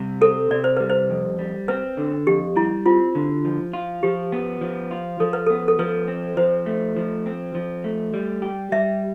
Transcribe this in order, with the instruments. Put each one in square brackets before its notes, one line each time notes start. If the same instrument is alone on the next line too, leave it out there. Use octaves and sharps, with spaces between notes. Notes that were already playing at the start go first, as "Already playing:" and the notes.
Already playing: [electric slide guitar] C3 G3
[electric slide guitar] C4 [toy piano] A4
[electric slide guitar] C3 [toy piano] D5
[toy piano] C5
[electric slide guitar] G3 [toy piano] B4
[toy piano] C5
[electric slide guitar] F2
G3
[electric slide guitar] C4 [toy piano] B4
[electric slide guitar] D3
[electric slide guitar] F2 [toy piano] G4
[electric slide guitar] G3 [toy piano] E4
[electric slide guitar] C4 [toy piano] F4
[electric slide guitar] D3
F3
F4
[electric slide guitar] F3 [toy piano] G4
[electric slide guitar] B3
F3
F4
[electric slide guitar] F3 [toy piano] A4
[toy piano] B4
[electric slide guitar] B3 [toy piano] A4
[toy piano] A4
[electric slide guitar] F3 [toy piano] B4
[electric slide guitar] C4
[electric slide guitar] F3 [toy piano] C5
[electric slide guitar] A3
F3
C4
F3
A3
G3
G4
[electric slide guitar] G3 [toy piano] E5